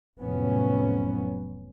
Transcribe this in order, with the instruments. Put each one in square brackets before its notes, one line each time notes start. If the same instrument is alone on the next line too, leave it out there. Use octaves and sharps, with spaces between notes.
[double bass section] F1 A2 F#3 B3 C#4